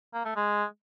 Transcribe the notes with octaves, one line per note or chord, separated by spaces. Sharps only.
A#3
A3
G#3